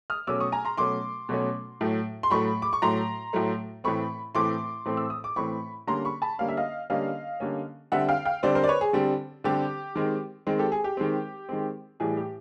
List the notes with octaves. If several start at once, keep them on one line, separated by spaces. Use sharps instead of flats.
D#6 F6
B2 F#3 A3 C#4 D6 E6
C#6 D#6
G#5 A#5
A#5 C6
B2 F#3 A3 C#4 C6 D6
B2 F#3 A3 C#4
A2 F#3 A3
C6
A2 F#3 A3 B5 C#6
D6
C#6
A2 F#3 A3 A#5 C6
A2 F#3 A3
A2 E3 A3 C4 B5 C#6
A2 E3 A3 C4 C6 D6
A2 E3 A3 C4
E6
D#6
D6
A2 E3 A3 C4 B5 C#6
D3 G3 A#3 C#4 A#5 C6
B5 C#6
A5 B5
D3 G3 A#3 C#4 F5
E5
D#5 F5
D3 G3 A#3 C#4 D#5 F5
D3 G3 A#3 C#4
D3 G3 C4 E5 F#5
F5 G5
F5 G5
D3 G3 C4 C5 D5
A#4 C5
D5
B4 C#5
G#4
D3 G3 C4
D3 G3 C4 G4
D#3 G#3 C4
D#3 G#3 C4
G4 A4
G#4
G4
D#3 G#3 C4
D#3 G#3 C4
A2 E3 G3 G#4
G4